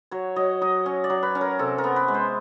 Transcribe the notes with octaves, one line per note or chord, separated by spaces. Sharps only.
F#3 C#5
F#3 D#5
F#3 D#5
C#4
D5
F#3
B4
C#4
A#4
C3 A4
A#4
B3
B4
G#3
C5